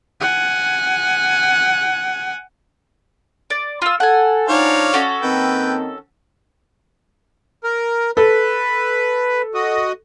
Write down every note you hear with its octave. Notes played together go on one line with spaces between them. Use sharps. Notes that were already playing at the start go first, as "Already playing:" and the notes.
F#5 G#5
D5
F4 E6
A4 F#5 G#5
F3 D4 D#4 C#5 D5 F5
C#4 F#4 A4
D#3 A#3 C4 B4 G5
A#4
A4 B4
F#4 D#5